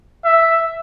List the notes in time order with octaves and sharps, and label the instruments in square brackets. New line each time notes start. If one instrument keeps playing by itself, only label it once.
[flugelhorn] E5